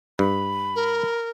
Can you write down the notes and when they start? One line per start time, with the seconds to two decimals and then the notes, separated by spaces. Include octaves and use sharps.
0.19 G2 B5
0.76 A#4